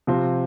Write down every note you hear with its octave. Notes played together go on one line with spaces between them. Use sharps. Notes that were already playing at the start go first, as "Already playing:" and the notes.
C3 F3 C4